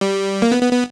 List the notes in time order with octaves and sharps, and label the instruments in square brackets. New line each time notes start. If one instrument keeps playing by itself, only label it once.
[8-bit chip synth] G3
A#3
B3
B3
B3